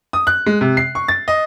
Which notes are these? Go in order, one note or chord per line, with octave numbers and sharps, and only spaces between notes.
D#6
F#6
G#3
C3
C7
C#6
A6
D#5